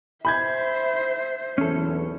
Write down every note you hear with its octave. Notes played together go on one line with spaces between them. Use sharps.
C5 E5 B5 G6 G#6
F#1 B1 E2 C#4 A4